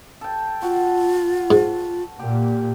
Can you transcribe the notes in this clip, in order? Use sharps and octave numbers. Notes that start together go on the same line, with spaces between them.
A4 G5
F4 F#4
G#2
A#2 G4